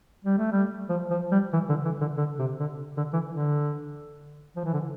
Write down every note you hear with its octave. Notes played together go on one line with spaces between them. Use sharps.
G3
A3
G3
F3
F3
G3
E3
D3
E3
D3
D3
C3
D3
D3
E3
D3
F3
E3
D3